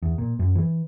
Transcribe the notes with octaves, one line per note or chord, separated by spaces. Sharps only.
E2
A#2
F#2
E3